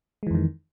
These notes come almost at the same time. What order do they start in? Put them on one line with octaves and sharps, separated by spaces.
G#3 E3 F2 D#3